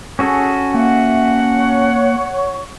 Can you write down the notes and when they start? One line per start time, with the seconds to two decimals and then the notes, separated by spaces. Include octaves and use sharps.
0.19 C#4 F#4 G#4 A4
0.75 A#3 E5 F#5
1.55 C#5 C#6